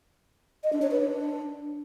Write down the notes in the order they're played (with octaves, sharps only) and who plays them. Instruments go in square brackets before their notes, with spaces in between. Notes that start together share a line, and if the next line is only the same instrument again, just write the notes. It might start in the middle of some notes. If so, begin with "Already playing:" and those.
[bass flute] D#5
D4
C#5
B4
D4